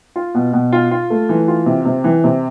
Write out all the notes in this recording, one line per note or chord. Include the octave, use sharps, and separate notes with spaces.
F4
B2
B2
F4
F4
A3
E3
F4
C3
C3
E3
C3